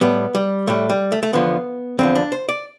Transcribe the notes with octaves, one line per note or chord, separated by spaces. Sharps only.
A2 G3 B3
G3
A2 G3 A3
G3
A3
A3
E2 D3 F3 B3
E2 D3 F3 C4
D4
C5
D5